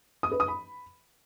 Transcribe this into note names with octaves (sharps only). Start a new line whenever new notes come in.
D#6
B4
D#6
B5